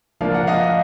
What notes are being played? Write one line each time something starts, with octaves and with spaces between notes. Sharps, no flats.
F3 A#3 D4 F5
F#5
D#5 F5